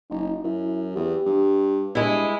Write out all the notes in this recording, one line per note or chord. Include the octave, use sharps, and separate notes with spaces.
F#1 D#4
F#2 E4
E2 G4
G2
G2 G#3 E4